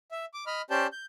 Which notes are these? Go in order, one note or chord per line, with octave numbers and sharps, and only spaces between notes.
E5
D6
D#5 B5 F6
C#4 G4 C5 D5 A5 G6
G6